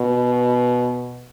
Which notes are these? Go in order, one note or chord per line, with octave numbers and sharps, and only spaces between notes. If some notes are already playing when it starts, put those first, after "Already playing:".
Already playing: B2